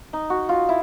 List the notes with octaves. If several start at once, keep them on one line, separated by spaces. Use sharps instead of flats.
D#4
F#4
F4
E4